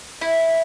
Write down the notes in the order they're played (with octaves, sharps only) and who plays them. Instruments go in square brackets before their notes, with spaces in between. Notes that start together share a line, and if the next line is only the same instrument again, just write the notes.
[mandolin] E4